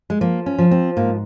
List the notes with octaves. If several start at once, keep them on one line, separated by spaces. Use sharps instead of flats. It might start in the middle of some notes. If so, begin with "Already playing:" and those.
G#3
F3 A#3
C#4
F3
C4
G#2 A#3